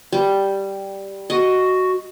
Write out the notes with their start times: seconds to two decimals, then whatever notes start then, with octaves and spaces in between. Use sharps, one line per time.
0.12 G3
1.30 F#4 D#5